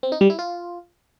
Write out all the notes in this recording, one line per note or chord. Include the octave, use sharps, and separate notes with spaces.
C4
D#4
G3
E4
F4